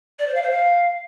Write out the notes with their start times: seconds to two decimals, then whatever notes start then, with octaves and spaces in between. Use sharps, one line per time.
0.19 D5
0.27 C5
0.34 F5
0.42 C5
0.50 F5